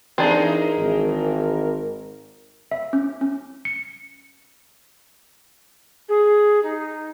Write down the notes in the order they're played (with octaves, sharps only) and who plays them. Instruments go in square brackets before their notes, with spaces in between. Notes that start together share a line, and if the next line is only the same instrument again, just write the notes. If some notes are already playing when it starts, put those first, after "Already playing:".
[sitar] E3 D#4 G#4 [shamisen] C4 D4 [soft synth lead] A#4
[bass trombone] G#1
[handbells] E5
C#4
C#4
C#7
[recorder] G#4
D#4